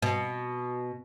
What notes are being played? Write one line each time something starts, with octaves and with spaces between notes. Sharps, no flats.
B2